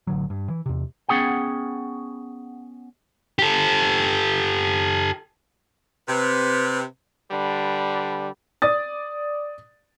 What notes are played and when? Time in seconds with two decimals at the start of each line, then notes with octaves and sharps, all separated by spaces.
0.07 A1 D3 F#3
0.30 G2
0.50 E3
0.66 E2 C3
1.09 B3 C#4 G#4 F#5 G5
3.39 G4 A4
6.08 C3 B4
7.31 D3 G3 B4
8.62 D5 D#6 A6